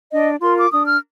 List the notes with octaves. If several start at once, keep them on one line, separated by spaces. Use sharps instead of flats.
D4 D#5
F4 A#4 C6
D6
D4 D#6
F6